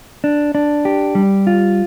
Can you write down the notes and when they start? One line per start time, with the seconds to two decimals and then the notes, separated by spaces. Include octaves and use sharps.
0.24 D4
0.55 D4
0.85 G4
1.15 G3
1.47 F4